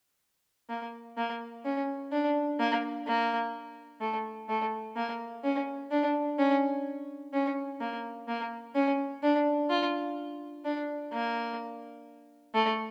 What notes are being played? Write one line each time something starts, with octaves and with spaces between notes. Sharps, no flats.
A#3
A#3
C#4
D4
A#3
A#3
A3
A3
A#3
C#4
D4
C#4
C#4
A#3
A#3
C#4
D4
F4
D4
A#3
A3